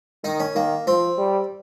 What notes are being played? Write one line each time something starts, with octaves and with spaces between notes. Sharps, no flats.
D#3 D#4
C#4
D#3 A#3
F3 C4
G3